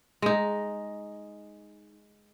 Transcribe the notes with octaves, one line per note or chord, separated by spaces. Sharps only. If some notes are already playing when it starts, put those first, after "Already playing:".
G#3 D#4